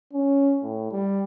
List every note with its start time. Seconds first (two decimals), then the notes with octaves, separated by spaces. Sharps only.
0.13 C#4
0.63 A2
0.92 G3